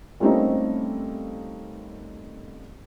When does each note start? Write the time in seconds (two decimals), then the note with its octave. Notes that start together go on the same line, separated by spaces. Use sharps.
0.20 G3 A3 A#3 C4 C#4 D#4